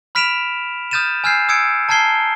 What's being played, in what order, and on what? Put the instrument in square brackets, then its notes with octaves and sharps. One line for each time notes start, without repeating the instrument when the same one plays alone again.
[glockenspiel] B5 F6 B6 D7 E7 F7
D#6 F6 G6 A6 D#7 E7
G#5 E6 F6 G6 G#6 C7
D#6 E6 G#6 C#7 D7
A5 A#5 F6 G#6 C7 G7